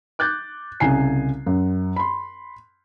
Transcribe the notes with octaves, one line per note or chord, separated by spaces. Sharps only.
D6 F#6 G6 A6
C2 C#3 G#5 C7
F#2
B5 C6